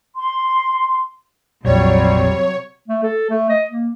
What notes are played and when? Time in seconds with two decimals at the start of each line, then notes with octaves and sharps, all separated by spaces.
0.15 C6
1.65 A#1 F2 C3 F#3 G3 C#5
2.88 A3
3.03 A4
3.30 A3
3.49 D#5
3.70 A#3